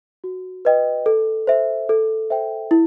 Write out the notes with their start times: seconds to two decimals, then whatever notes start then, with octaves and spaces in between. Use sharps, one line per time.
0.24 F#4
0.65 B4 D#5 G5
1.06 A4
1.47 C5 E5
1.89 A4
2.30 C5 E5 G5
2.71 E4